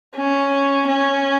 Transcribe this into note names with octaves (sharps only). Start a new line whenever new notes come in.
C#4
C#4